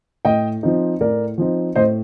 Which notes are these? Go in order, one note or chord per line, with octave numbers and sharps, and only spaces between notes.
A2 D#5 G5
F3 C4 D#4
A2 A#4 D5
F3 C4 D#4
A2 C5 D#5